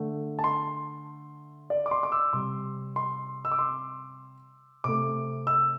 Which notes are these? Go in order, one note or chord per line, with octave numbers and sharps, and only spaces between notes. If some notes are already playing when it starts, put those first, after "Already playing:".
Already playing: D3 A3
A5
C6
D5
D6
C6
D6
E6
C3 G3 C6
C6
E6
D6
C6
C3 A3 D6
E6